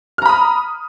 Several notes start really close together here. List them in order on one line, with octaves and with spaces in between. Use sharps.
F6 A#5 B5 D#6